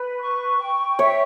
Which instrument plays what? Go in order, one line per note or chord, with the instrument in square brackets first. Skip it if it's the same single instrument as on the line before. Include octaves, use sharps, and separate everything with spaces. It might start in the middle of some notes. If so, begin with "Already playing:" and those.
Already playing: [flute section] B4 [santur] B5
[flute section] C#6
G5
[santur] C#5 [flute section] E5